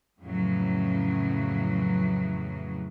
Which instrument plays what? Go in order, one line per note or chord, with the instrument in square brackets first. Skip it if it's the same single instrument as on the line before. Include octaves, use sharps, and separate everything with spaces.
[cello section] F2 A2 C#3 E3 F#3